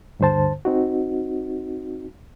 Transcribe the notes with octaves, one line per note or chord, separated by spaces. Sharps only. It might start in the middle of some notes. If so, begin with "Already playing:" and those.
D2 G2 D3 C5 A5
C4 D#4 F#4